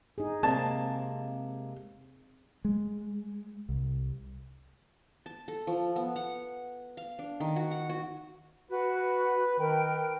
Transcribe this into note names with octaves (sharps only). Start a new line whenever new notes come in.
D#4 G#4
C3 G#3 A#3 C4 A5
G#3
C2
A5
A4
F3
B3
F#5
F5
D4
D#3
F#4
F#5
F#4
F#4 B4
B4
D#3 A#4 B4 G5